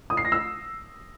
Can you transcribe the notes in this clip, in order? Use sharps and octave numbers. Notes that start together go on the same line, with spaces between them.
D#6
C7
A#6
E6